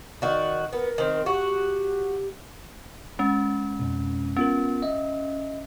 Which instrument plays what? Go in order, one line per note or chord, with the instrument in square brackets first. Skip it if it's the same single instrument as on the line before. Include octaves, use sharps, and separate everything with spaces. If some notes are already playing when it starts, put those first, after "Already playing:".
[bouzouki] D#3 F#4 [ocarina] D5
[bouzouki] B3 [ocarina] A#4
[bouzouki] D#3 C4
[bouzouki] F#4 [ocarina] G4
[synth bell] G#3 C#4
[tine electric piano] F2 B2
[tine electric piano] B3 F4 A#4 [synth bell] C#4
[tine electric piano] D#5 E5